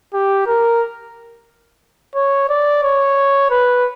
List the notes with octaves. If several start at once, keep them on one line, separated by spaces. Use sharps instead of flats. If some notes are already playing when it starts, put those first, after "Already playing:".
G4
A#4
C#5
D5
C#5
B4